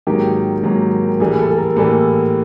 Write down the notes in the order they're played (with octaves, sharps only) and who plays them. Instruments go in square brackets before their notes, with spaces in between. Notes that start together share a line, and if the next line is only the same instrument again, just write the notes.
[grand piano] G#2 D#3 F#3 A#3 G4
G#2 D#3 F#3 A#3
A2 E3 G3 A#3 G#4
A4
A4
A#4
A2 E3 G3 A#3 A4